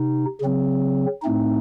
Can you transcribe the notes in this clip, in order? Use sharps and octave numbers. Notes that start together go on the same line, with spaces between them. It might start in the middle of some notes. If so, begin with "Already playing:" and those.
Already playing: C3 D#4
C#3 F#3 C4
A2 A3 C4 D#4